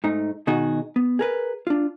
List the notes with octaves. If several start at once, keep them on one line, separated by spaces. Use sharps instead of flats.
G#2 A3 D#4
B2 D#3 D#4 F#4 G#4
B3
G#4 A#4 B4
D4 F4